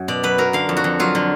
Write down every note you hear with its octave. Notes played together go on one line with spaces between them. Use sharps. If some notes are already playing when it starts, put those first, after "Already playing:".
Already playing: F#2
B2 D5
F#3 B4
F#3 A#4
D3 F5
F2
F#4
F2
F#3 F4
D3